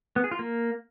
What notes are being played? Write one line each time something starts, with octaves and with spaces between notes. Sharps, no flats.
B3
G#4
F4
A#3